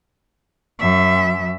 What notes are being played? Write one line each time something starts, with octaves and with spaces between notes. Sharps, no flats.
F#2 E5